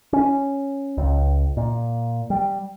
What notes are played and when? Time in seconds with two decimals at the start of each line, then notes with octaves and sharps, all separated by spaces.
0.13 C#4
0.98 C#2
1.57 A#2
2.30 G3